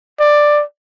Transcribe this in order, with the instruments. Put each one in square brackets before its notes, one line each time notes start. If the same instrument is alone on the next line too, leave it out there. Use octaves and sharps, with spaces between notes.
[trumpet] D5